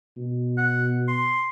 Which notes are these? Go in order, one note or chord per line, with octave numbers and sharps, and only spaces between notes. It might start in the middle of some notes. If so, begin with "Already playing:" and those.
B2
F#5
C6